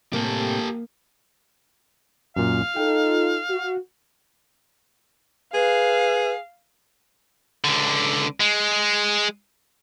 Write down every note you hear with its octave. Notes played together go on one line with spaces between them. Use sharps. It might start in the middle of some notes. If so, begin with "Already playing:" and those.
A2 C3 G3 A#3 G4 A4
F#2 A#2 F5
D#4 F4 A4 G5
F#4
G#4 B4 F5
C#2 D3
G#3